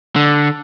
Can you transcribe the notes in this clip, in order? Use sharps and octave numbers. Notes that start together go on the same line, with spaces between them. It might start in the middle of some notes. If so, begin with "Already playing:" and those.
D3